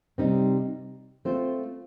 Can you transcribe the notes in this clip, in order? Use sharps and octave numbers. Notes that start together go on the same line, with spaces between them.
C3 G3 C4 D#4
A3 C4 F4 C5